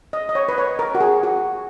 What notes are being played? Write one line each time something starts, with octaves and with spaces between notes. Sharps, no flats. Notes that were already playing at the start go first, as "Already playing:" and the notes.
D#5
D#5
C#5
B4
C#5
A#4
F#4
G#4
F#4